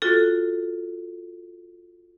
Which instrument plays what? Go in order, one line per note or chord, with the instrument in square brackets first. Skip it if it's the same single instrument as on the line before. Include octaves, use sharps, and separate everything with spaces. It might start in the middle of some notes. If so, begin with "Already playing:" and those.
[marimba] F4 F#4 A4